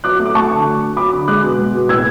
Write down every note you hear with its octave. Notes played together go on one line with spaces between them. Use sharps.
F#3 D6 F#6
A3
D6
A3 A5 C#6
D3
F#3
F#3
F#3 B5 D6
D3
G#3 D6 F#6
B2
G#3
B2
A2 E6 G#6